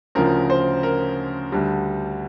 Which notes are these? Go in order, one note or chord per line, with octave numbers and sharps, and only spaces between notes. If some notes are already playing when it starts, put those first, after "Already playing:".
D2 C#3 F3 A#4
C5
A#4
D2 D3 G3